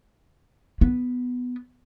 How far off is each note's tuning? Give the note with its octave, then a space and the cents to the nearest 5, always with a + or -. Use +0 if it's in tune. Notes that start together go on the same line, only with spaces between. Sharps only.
B3 +5